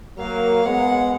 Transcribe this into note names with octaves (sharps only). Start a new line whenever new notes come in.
F#3 A#3 F5
G#3 B3 F#5